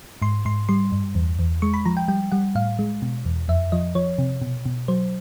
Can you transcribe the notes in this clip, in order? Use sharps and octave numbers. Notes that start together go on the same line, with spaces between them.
G#2 C6
G#2 C6
G3 C6
G2
E2
E2
G#3 C#6
B5
F3 A#5
G5
G3 G5
G3 F#5
A2 F5
G#3
B2
E2
F2 E5
F3 D#5
F3 C#5
C3
B2
B2
F#3 C5